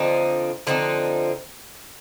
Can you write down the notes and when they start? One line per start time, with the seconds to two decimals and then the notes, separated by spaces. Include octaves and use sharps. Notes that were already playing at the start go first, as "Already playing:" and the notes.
Already playing: D3 F3 C4 D#4
0.67 D3 F3 C4 D#4